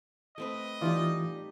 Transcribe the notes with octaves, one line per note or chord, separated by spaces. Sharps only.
A3 C4 B4 D#5
E3 G3 D#4 F4 G4 D5